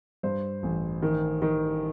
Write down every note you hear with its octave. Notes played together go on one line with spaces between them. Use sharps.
G2 C5
A1
D#3
D#3